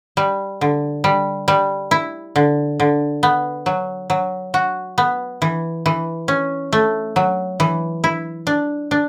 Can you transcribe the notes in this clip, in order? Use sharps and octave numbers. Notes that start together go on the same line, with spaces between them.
G3
D3
G3
G3
E4
D3
D3
B3
F#3
F#3
F#4
B3
E3
E3
C#4
A3
F#3
E3
E4
D4
D4